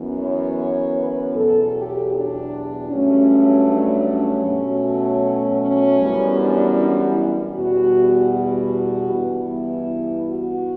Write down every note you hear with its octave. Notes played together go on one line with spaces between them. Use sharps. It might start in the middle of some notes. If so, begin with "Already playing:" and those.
Already playing: F#2 E3 B3
C#5
B4
E2 B2 F#3 A4
G4
D4
G2 F#3 A3 C#4
D4
C#4
B2 F#3 A3
C#4
F#2 E3 G3 B3
D4
E4
E2 B2 G3 F#4
F#4
G2 E3 B3
E4
F#4